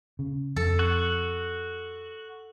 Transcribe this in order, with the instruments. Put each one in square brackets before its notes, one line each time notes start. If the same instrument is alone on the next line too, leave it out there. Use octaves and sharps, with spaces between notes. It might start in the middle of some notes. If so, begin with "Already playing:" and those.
[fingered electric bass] C#3
[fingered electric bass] F2 [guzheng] A4
[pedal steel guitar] F#4 F#6